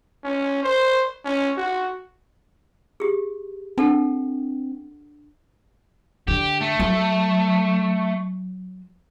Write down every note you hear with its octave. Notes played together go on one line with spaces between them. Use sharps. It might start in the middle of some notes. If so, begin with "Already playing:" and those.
C#4
C5
C#4
F#4
G4 G#4
C4 D4 A4 F#5
D3 G4
A3
F#3